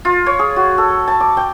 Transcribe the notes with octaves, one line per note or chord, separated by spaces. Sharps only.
F4
C#5
G#4
F#4
A4
A5
D6
G5